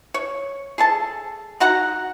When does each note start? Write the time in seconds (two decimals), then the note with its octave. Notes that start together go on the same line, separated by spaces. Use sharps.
0.14 C#5
0.78 G#4 A4 A5
1.60 D#4 F#4 F#5 A#5